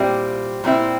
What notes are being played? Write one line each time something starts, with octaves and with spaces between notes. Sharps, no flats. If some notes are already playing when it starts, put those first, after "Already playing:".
Already playing: A#2 G3 C4 E4
A#2 G3 C4 E4